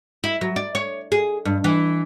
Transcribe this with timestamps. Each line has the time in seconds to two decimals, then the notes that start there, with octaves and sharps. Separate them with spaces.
0.24 E4
0.41 F#3
0.56 D5
0.75 C#5
1.12 G#4
1.45 G2
1.64 E3